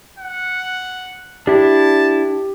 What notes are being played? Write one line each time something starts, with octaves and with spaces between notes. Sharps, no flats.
F#5
D4 E4 G4 A5